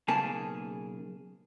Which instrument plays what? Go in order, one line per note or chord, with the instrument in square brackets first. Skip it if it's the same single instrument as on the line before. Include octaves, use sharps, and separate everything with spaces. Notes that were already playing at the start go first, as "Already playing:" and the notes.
[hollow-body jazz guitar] B1 C#3 A#3 G#4 A5